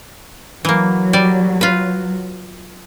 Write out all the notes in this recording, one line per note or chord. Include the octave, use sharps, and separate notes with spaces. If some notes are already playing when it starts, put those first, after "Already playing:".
E3 F#3 A#3
G3 D5
F4 B4